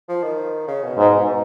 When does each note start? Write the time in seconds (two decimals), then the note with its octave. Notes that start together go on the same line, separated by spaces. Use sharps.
0.09 F3
0.24 D#3
0.68 C#3
0.83 B2
0.98 G#2